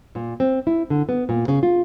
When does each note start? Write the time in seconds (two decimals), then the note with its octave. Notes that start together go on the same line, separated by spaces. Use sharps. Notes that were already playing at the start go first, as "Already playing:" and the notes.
0.15 A#2
0.40 C4
0.67 E4
0.90 D3
1.09 B3
1.29 A#2
1.48 C#3
1.63 F4